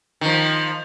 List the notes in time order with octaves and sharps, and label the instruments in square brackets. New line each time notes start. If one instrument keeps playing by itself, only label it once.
[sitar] D#3 F3